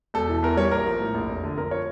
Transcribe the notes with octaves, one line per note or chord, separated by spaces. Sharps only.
E1 A4
E3
E2 A#4
G3 C#5
A#1 A#4
F3
A2
A#1
F1
D3
F2 A#4
F3 C#5